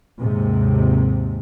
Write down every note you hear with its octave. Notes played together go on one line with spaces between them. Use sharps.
D#2 G#2 C3